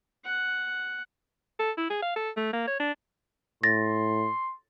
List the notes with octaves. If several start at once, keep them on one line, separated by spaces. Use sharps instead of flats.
F#5
A4
E4
G#4
F5
A4
A3
A#3
C#5
D4
A2 C6 A6 A#6